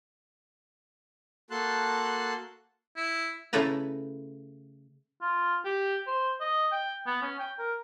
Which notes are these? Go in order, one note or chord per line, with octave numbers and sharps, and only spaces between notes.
A#3 F#4 A4 A5 C6 F#6
E4
C#3 A3 E4 A4 B4 A#5
F4
G4
C5
D#5
G5
B3
C#4
G5
A#4